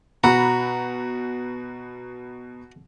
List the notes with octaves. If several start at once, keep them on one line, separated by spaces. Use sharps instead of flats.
B2 F#4 A#5 B5